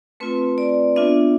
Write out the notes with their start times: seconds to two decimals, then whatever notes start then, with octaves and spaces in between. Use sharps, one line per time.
0.20 A3 C4 F4 B4
0.58 D5
0.96 B3 D4 F4 E5